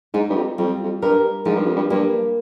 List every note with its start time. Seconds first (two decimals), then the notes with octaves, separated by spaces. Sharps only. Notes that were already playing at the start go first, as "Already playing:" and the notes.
0.14 G#2 D#4
0.30 G2
0.36 F2
0.58 F2 G3
0.84 F2
1.02 G2 A#4
1.45 G#2 F3
1.56 G2
1.66 F2
1.76 G2
1.90 G2 A#3